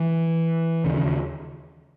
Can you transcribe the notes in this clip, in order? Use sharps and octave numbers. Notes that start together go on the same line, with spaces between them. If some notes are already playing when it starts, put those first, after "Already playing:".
Already playing: E3
D#2 C#3